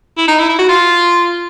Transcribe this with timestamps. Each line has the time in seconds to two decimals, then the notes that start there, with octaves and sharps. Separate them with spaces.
0.17 E4
0.28 D#4
0.39 E4
0.49 E4
0.59 F#4
0.69 F4